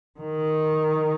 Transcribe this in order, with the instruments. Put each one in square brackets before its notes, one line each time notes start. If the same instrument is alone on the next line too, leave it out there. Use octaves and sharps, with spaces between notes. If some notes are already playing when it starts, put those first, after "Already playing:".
[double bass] D#3